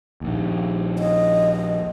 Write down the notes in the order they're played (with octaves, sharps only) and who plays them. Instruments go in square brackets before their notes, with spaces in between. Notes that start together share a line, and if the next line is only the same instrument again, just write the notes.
[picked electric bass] A#1 D#2
[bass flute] D#5